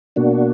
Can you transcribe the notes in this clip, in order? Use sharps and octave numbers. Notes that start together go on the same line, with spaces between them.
B2 A#3 D4 F#4